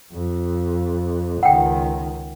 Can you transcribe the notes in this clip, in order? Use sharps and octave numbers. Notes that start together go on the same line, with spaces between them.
F2
C#2 D#3 F#5 G5